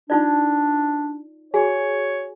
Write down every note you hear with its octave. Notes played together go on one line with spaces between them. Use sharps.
D4 D#4 F4 D5
F#4 G#4 C#5 G#5